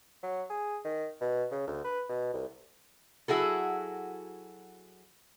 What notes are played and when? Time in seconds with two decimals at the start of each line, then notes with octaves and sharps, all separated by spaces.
0.23 F#3
0.50 G#4
0.85 D#3
1.21 B2
1.51 C#3
1.67 D2
1.84 B4
2.09 B2
2.34 C2
3.28 F#3 E4 F#4 G#4 A4